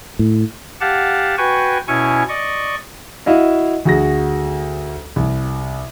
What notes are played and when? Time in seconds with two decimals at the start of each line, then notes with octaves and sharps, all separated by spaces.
0.19 A2
0.81 G4 F5 F#5 A5
1.38 F#4 B4 G5 G#5 C#6
1.88 B2 C#4 E4 G#5 C#6
2.29 D5 D#5 C#6
3.26 E4 F#4 D#5 F5
3.85 D2 F#4 G#4 A#6
5.16 C2